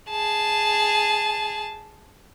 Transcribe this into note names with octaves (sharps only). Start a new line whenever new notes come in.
G#4 A5